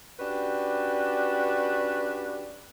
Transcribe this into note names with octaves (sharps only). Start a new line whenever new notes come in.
C#4 D4 F#4 G4 B4